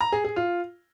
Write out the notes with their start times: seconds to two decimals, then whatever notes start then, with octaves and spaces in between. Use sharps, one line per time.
0.01 A#5
0.12 G#4
0.24 G#4
0.36 F4